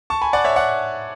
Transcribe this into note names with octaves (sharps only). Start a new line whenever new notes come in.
A5 C#6
G#5 B5
D5 F#5
C#5 E5
D5 F#5